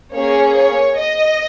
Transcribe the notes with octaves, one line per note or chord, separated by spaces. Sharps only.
A#3 C#4 G#4 C#5
C#5
D#5